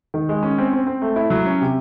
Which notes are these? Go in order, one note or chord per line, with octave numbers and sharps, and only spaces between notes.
D#3
G#3
C#4
C4
C4
C4
A3
E4
F#3
C#4
C3